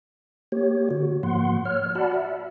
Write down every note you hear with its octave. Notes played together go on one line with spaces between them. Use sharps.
A#3 G4 C#5
D3 F#4
G#2 F3 A#3 F#5 C6
C#5 F6
F#4 D5 F#5 A5 B5
E5